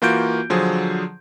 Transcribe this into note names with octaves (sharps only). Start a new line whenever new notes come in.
E3 A#3 F4 F#4 G6 D7
D3 F3 F#3 G#4 C5